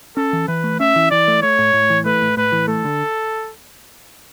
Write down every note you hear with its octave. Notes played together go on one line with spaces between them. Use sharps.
C#4 A4
E3
E3 B4
A3
C#4 E5
E3
E3 D5
A3
A3 C#5
A2
A2
E3
A3 B4
A2
A2 B4
E3
A3 A4
D3